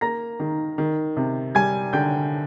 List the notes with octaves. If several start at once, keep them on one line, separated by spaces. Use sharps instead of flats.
A#3 A#5 A#6
D#3
D#3
C3
G3 G#5 G#6
D3 G5 G6